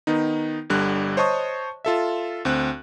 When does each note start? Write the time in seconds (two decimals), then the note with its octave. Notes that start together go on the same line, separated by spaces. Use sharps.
0.07 D#3 B3 D#4
0.70 G1 D3 G3 F#6
1.17 C5 C#5 D#5 A5 C#6 D#6
1.85 F4 A4 E5
2.45 D2 C4 F#6